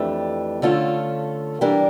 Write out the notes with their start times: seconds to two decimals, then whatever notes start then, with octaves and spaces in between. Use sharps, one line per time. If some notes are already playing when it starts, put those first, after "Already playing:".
Already playing: F2 E3 A3 D4 G4
0.62 D3 A3 C#4 F4 A4
1.61 E3 G3 D4 G4 A#4